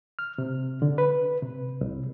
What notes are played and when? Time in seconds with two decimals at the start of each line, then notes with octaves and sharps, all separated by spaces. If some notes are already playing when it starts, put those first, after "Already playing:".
0.19 F6
0.38 C3
0.82 D3
0.98 B4
1.42 C3
1.81 C2